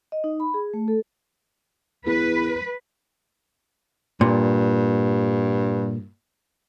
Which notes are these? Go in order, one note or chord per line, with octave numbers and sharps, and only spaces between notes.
D#5
D#4
B5
G#4
A3
A4
E2 B4
G2 A#2